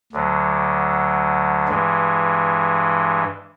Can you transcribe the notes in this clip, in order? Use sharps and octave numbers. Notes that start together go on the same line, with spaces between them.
D2 D3 F#3
G2 E3 G#3